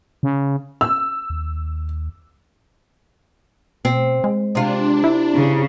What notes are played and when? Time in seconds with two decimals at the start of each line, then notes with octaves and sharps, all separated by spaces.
0.23 C#3
0.81 E6
1.30 D#2
3.85 B2 C4
4.24 G#3
4.55 C3 D4 F4
5.04 E4
5.35 C#3